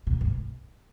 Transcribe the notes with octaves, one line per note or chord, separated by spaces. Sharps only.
B2
G#2